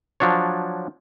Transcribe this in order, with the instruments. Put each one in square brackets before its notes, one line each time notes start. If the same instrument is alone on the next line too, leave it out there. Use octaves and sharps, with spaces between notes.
[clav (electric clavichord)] F3 F#3 D4 C#5